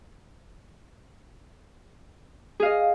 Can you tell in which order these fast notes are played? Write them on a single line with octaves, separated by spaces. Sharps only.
G#4 F5 D#5